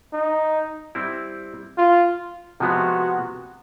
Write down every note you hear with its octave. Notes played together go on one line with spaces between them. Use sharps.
D#4
G3 C4 E4
F4
C3 F3 G#3 B3 F#4